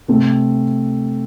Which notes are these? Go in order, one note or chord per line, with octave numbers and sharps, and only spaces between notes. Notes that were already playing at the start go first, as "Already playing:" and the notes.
C3 A3 C4 A4